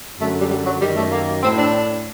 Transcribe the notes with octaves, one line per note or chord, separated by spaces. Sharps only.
F#2 D3 A3
G3
G3
F#3
F#2 D#3 G3
A3
A#3
A2 C4
D4